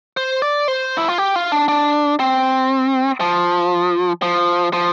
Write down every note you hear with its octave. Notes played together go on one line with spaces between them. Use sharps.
C5
D5
C5
E4
F4
G4
F4
D4
D4
C4
F3
F3
F3